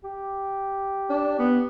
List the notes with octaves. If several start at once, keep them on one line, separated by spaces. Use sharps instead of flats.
G4
D4
B3